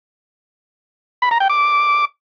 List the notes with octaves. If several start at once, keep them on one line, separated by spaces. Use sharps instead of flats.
B5
A#5
G5
D6